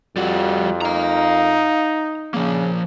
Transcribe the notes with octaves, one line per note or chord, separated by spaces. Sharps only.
F2 G3 F#4
D#4 F5 A#5
C#3 F3 A#3